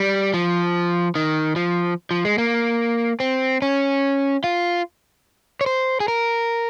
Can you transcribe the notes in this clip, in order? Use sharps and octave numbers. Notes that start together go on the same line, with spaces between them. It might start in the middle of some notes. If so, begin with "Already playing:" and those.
Already playing: G3
F3
D#3
F3
F3
G#3
A#3
C4
C#4
F4
C#5
C5
G#4
A#4